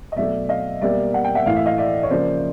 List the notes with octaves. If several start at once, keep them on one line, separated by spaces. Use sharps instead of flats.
D#5
B2 F#3 A3 D5 E5
D#5 F5
B2 G3 A#3 D5 E5
F#5
G5
E5 F#5
A2 E3 A3 F5
E5
D#5 F5
D5 E5
C#5
C#3 F3 A#3 C5 D5